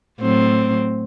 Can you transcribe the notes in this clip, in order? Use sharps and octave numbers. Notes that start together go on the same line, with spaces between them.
A2 F#3 C4